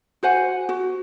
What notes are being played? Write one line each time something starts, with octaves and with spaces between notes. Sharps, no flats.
F#4 C5 F#5 G#5
F#4